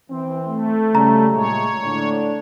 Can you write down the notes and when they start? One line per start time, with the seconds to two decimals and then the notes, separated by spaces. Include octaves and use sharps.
0.11 E3 C4
0.46 A3
0.95 C#3 G3 A#5
1.35 A#2 G#3 C#5
1.84 A2 D3 D4